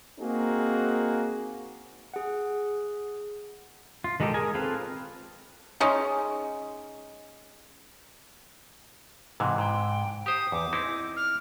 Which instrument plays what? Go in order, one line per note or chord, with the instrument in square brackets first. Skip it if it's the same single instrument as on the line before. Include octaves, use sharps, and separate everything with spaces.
[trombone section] A#3 C4 D#4 F#4 G#4
[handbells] G#4 F#5
[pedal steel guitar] F4
D#3 G#3 D#4 G4 A4
G#4 A#4 G#5
C4 F4 A4 B4 F5
[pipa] G#3 C#4 D#4
[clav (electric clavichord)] G#2 C3 E3
[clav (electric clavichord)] G#2 [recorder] G5
[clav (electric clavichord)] G4 C5 [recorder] D#6
[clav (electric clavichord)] E2 [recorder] D6
[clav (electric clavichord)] C4 D#4 E4
[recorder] F6